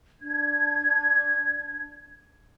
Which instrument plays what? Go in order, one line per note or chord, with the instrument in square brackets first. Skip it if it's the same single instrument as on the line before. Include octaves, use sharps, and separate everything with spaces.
[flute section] D4 G#6